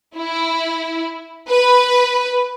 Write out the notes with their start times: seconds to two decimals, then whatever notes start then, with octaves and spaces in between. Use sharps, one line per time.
0.16 E4
1.48 B4